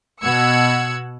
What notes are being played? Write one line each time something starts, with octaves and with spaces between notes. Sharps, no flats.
B2 F#5 E6 G#6 C#7